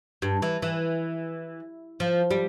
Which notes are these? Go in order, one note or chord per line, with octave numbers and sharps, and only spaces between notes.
G2
E3
E3
F3
G3